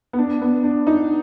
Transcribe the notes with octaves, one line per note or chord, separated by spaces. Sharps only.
B3
D4
B3
D4
D#4